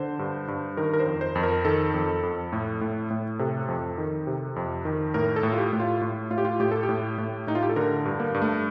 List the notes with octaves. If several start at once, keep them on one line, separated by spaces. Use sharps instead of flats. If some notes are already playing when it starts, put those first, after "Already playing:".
Already playing: D3 C5
G2
G2
D#3 A#4
A#4
C5
F2
C5
F2
A#4
D#3 A4
F2
F2
A2
A2
A2
C3 A4
F2
D#3
C3
F2
D#3
A2 A#4
A4
A2
F4
G4
A2
F4
A2
A2 F4
G4
F4
A2 G4
A4
G4
A2
A2
A2 D#4
F4
G4
A4
D3 A#4
G2
A#3
G2
A3